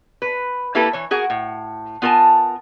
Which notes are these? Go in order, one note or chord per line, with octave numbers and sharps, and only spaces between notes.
B4
A#3 E4 G4 A4 B4
E3 C#5
F#4 G#4 A#4 F#5
A2
B3 F4 A#4 G#5 A5